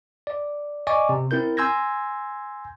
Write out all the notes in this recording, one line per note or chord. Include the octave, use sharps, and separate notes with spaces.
D5
D5 D#5 G#5 C#6 D6
C3
C4 E4 A#4 G6
G#5 C6 E6 G6 G#6 A#6